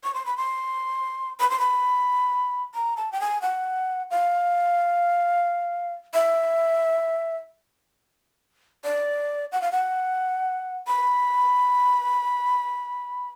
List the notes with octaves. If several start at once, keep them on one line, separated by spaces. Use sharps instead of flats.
C#6
C6
B5
C6
B5
C6
B5
A#5
A5
G5
G#5
F#5
F5
E5
D5
F#5
F5
F#5
B5